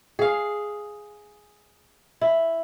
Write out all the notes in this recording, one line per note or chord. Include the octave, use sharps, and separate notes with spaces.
G#4 F5
E4